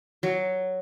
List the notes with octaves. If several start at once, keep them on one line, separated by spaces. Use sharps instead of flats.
F#3